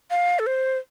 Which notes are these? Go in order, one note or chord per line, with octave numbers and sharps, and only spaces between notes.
F5
A4
C5